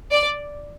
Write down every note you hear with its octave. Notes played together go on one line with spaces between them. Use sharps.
D5